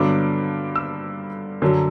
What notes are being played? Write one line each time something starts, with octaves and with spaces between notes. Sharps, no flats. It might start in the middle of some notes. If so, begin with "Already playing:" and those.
Already playing: G2 D3 F#3 B3 D4 D6
E6
F#2 D3 F#3